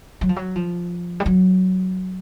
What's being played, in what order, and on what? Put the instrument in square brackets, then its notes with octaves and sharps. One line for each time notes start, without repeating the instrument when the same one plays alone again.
[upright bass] F#3
F3
F#3
F3
G3
F#3